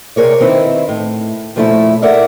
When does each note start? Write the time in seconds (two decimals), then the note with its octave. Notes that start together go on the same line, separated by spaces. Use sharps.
0.16 C3 G#4 A#4 C#5 D5
0.40 D#3 C4 D#4 E4 B4
0.89 A2
1.56 A#2 F3 A3 C#4 E4
2.02 A4 A#4 D5 E5 F#5